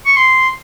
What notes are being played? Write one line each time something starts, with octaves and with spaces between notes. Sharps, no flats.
C#6
C6